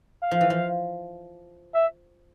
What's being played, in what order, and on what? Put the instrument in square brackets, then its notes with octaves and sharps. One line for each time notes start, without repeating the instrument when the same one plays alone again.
[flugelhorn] F5
[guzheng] F3
E3
F3
[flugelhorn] E5